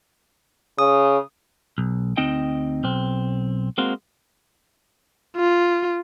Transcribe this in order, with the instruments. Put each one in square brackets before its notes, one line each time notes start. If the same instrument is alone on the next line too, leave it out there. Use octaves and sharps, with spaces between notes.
[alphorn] C#3 [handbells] D#6
[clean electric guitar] B1
D2 C4 D#4 D#5 G5
B1 C4
G#3 A#3 C4 F#4
[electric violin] F4